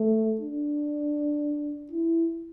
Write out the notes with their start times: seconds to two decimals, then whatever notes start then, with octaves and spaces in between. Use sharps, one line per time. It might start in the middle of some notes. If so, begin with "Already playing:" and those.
Already playing: A3
0.41 D4
1.91 E4